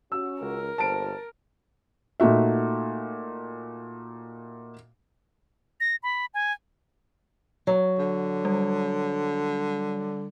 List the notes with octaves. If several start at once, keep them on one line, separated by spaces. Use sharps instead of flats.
C#4 F#4 E6
C#2 A#4
G1 A#3 F4 C5 A5 D7
A#2 A3 D#4 F#4 E5
A#6
B5
G#5
F#3
D3
G3